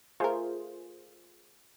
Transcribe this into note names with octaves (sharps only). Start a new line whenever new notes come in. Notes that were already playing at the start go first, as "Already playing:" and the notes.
A3 F4 G#4 A#4 C5